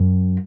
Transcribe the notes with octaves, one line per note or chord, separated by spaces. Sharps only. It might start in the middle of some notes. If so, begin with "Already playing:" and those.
Already playing: F#2